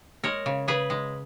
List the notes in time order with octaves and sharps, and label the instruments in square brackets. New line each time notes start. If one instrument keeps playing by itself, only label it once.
[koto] G#3 A#4 C#5
C#3
C#3 G#4 B4
G#3